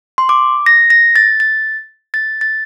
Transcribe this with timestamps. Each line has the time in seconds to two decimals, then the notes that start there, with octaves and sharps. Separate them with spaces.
0.18 C6
0.29 D6
0.66 A#6
0.90 A#6
1.16 A6
1.40 A6
2.14 A6
2.41 A6